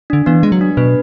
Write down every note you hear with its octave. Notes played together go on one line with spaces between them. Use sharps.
D3 D4
E3 B3
G#3 B3
F#3
D4
B2 B4